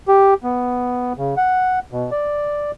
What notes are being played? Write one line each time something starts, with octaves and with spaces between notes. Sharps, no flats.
G4
B3
C#3
F#5
B2
D5